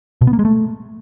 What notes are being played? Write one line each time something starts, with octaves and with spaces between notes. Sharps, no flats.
B2
B3
A#3
G#3
A3